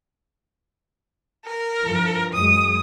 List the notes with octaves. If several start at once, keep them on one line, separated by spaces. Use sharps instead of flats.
A#4
G2 E3 F3
F#2 G#3 D#6